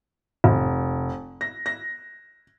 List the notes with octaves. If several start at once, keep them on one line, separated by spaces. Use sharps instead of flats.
F1
A#6
A#6